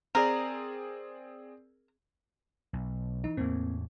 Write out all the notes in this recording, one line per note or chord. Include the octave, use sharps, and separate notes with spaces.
C4 G#4 A#4 D5
B1
E3 D#4
E2 A2 A#3 C4